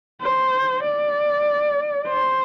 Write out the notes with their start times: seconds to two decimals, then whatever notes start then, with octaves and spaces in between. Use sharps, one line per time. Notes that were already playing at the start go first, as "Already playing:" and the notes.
0.22 C5
0.84 D5
2.08 C5